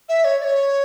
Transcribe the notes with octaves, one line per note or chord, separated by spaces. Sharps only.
E5
C#5
D5
C#5